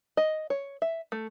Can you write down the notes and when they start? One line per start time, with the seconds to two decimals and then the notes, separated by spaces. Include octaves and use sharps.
0.17 D#5
0.50 C#5
0.82 E5
1.12 A3